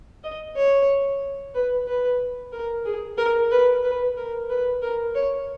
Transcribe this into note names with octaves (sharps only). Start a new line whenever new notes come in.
D#5
C#5
B4
B4
A#4
G#4
A#4
B4
B4
A#4
B4
A#4
C#5